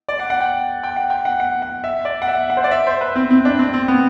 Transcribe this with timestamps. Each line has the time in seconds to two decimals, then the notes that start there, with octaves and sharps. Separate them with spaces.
0.09 D5
0.19 F#5
0.30 F#5
0.41 G5
0.83 G5
0.96 F#5
1.10 G5
1.25 F#5
1.40 F#5
1.62 F#5
1.84 E5
2.05 D5
2.22 F#5
2.28 E5
2.50 F#5
2.57 C5
2.64 D5
2.71 E5
2.87 C5
3.01 B4
3.15 C4
3.31 C4
3.45 D4
3.59 C4
3.74 C4
3.88 B3